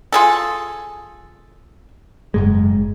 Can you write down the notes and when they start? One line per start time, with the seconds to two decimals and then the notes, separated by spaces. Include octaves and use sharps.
0.12 F4 G#4 A4
2.34 F#1 G#2 G#3